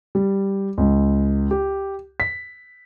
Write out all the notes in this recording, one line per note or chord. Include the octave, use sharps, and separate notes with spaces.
G3
C#2
G4
B6